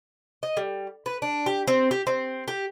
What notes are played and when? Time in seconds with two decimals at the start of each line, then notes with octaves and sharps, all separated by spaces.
0.43 D#5
0.57 G3
1.06 B4
1.22 D4
1.46 G4
1.68 C4
1.91 G4
2.07 C4
2.48 G4